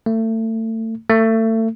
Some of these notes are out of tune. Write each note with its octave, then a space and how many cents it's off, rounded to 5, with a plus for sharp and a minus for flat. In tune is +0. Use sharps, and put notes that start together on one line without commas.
A3 +30
A3 +30